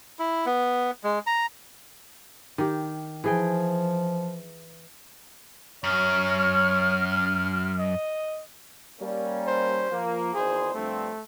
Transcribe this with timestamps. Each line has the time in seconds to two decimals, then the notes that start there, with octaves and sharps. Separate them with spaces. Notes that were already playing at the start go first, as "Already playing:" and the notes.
0.19 E4
0.46 B3
1.04 G#3
1.27 A#5
2.58 D#3 G4
3.24 E3 F3 G#4 G5
5.84 F#2 C#5 F6
7.80 D#5
9.01 G3 A#3 C#4
9.48 C5
9.91 F3 A#3
10.35 G#1 E2 G#4 C5
10.75 G2 F3 A3 C4